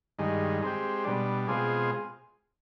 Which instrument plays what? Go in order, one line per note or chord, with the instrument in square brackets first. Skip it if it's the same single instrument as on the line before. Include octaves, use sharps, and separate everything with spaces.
[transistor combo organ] G2 D#3 G#3
G#3 C4 G4
B2 G3 D4
B2 G#3 C4 F4 G#4